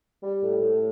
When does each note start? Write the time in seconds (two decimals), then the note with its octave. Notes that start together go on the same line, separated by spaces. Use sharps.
0.23 G3
0.42 A2
0.62 A2